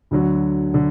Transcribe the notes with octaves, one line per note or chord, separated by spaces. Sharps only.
D2 D3 F#3
D3